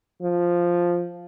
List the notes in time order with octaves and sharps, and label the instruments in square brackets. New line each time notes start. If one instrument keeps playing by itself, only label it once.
[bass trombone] F3